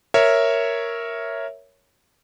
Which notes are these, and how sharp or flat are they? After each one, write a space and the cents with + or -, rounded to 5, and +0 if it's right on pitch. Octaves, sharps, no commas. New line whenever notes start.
A#4 +0 C#5 +0 E5 +0